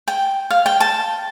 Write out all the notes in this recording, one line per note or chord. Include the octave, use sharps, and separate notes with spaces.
G5
F5
G5
A5